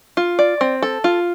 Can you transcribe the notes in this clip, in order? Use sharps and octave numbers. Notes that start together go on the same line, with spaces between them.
F4
D5
C4
A4
F4